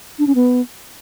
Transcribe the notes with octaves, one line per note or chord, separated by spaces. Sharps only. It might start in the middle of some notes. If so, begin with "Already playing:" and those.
D4
C#4
B3